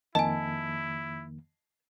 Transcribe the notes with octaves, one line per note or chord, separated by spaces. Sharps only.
F2 D#3 A#3 E4 D#5 G#5 A5